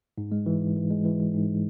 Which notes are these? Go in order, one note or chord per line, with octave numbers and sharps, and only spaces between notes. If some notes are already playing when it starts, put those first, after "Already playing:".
G#2
G#3
E3
G#2
E3
G#3
E3
E3
G#2